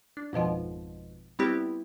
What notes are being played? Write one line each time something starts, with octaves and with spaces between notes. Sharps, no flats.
D4
G#1 F2 B2 F3
G3 B3 C4 E4 G4